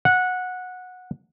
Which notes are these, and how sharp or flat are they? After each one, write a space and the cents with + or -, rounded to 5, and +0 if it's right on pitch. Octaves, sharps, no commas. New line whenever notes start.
F#5 -15